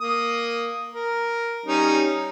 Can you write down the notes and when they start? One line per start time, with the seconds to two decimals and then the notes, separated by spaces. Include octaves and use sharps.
0.01 A#3 D#6
0.93 A#4
1.66 G3 C#4 D#4